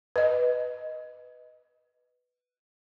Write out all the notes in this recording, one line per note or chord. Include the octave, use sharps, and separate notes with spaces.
B4 D#5